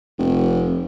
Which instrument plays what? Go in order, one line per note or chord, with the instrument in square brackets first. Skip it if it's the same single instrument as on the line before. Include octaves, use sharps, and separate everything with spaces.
[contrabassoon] F1